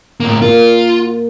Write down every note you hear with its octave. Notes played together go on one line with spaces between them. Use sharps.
A2 A#3
A#3 F4